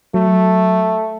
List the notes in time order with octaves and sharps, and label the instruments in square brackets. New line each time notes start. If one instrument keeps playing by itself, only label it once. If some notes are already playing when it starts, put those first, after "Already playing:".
[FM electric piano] F#3 [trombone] A3